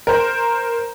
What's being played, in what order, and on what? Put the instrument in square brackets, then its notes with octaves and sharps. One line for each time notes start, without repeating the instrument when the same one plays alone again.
[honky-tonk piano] A#4 C5